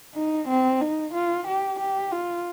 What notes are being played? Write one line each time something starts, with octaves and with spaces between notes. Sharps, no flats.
D#4
C4
D#4
F4
G4
G4
F4